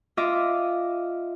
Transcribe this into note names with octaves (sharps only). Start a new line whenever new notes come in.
F4 D#5 E5 D6